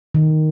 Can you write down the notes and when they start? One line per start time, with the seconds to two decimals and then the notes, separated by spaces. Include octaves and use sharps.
0.15 D#3